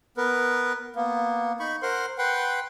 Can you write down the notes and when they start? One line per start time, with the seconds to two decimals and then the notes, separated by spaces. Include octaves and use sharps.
0.17 B3 A#4 B4
0.96 A#3 B3
1.60 D#4 B5 C#6
1.82 A#4 C5 F#5 C6
2.18 B4 F#5 G5 C6